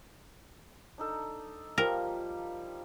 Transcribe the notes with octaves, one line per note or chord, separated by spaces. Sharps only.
D4 D#4 A4
F3 G3 A#3 A#4